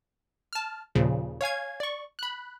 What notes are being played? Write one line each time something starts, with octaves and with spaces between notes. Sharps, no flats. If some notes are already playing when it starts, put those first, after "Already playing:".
A5 F6
D#2 A#2 C#3 F3
C#5 F5 G#5 G#6
D5 C#6
B5 F#6